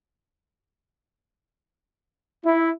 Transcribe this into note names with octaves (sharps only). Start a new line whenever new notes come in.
E4